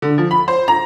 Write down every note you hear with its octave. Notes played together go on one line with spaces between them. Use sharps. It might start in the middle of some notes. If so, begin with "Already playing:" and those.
D3
F3
B5
C5
A#5